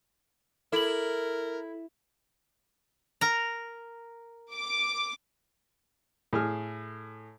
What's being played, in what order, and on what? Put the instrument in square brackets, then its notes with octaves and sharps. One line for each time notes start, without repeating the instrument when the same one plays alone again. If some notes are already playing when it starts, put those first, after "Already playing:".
[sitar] E4 [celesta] A4 F#7 [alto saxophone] A#4
[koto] A#4 A#5
[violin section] D6
[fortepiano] A2 G#4 F6